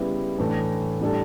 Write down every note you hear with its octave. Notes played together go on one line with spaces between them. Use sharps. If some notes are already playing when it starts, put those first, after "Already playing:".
Already playing: C#3 G3 B3 E4
A2 E3 A3 D4
A2 G3 D4 A4